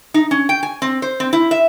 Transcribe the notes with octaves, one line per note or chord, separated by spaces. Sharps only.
D#4
C#4
G5
G#5
C4
C5
C4
E4
E5